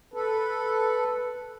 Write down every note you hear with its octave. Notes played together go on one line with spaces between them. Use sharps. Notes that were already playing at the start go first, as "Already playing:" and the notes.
A4 B4